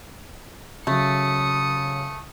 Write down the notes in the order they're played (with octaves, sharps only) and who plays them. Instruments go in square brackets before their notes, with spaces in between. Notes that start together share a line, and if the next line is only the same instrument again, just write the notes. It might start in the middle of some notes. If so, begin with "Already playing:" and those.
[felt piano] C#3 F#3 [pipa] A3 [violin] D#6 C#7